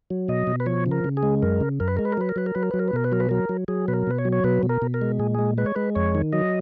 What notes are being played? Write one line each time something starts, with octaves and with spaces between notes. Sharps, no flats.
F#3
B2 D#5
B2
B4
F3 C#5
C#3
A#4
C#3
G#4
G#3
F#2 A#4
C#3
F#2 A#4
B4
G#3 A#4
B4
A#4
F#3 B4
A#4
F#3 B4
A#4
F#3 B4
A#4
F#3 B4
A#4
B4
B2 A#4
B4
F#3 A#4
B4
F#3 A#4
F#3
F#3 G#4
B2 B4
A#4
B2 B4
C#5
F#3
C#5
B2 B4
B2
A#4
B2
A#4
G#3
A#2 G#4
G#3 G#4
G#3 B4
C#5
G#3 B4
F2 C#5
D#3
F#3 D#5